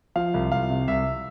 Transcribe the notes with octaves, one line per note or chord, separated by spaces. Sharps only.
F3 F5
C2
C2 F5
C3
C2 E5